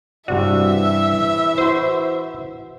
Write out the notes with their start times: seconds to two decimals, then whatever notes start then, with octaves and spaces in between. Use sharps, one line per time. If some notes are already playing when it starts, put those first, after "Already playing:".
0.28 G2 C3 E3 F#4 D5 E5
1.58 E4 F#4 C5 C6